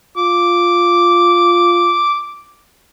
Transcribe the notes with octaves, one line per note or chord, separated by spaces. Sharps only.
F4 D6